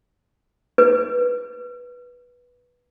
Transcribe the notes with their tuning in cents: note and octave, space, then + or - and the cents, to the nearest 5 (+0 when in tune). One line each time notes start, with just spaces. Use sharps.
B4 -10